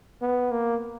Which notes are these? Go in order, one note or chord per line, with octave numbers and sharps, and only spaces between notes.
B3
A#3